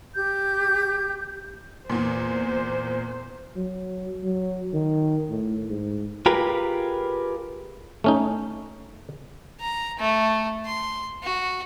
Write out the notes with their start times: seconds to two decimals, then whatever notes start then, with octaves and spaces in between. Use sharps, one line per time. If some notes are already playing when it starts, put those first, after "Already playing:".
0.15 G4 G6
1.90 E2 A#2 C5
3.56 F#3
4.23 F#3
4.74 D#3
5.30 A2
5.70 G#2
6.26 F4 G4 G#4 A#4 B4
8.04 A3 C#4 D#4
9.60 A#5
9.99 A3
10.65 C6
11.23 F#4